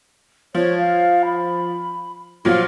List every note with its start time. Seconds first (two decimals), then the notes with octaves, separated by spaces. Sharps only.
0.55 F3 C#5
0.78 F5
1.25 B5
2.45 A#2 F3 F#3 F4